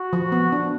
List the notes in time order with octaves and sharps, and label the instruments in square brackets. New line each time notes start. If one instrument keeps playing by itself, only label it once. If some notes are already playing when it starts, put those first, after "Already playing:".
Already playing: [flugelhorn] F#4
[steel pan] F3
B3
D4